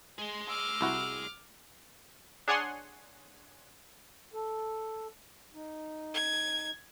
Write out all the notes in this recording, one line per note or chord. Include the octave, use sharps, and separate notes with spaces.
G#3 G#4 C6
D6 E6 F6
C2 E4 F#4
D4 G#4 C#5 F#5 G#5 C6
A4
D#4
G#6